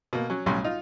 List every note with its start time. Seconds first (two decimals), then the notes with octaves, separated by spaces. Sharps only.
0.13 B2 A#3
0.30 F#3 C#4
0.46 B1 A2 F#3 G3 C#4 C6
0.64 D#4 F4